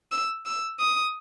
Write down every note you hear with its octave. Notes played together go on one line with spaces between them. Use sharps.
E6
E6
D#6